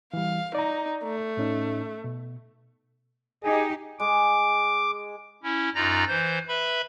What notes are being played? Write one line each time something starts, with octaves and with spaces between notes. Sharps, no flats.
E3 G3 F5
D#4 D5 A#5
A3
A2 C#4 D#4
B2
D#4 G4 G#4
G#3 D6
C#4 E4
F#2 D#4 F4 D5 A#5 A#6
E3 C5 G6
B4 E5 B5